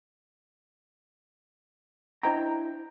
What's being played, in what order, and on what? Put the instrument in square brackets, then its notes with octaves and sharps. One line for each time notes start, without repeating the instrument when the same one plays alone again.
[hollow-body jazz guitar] D4 E4 C5 D#5 G5 A#5